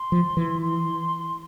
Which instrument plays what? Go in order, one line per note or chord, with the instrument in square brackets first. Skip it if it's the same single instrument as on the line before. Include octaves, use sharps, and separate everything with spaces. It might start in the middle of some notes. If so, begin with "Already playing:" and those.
Already playing: [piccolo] C6
[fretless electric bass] F3
E3
[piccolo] C6